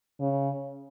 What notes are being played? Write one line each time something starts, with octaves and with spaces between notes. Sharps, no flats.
C#3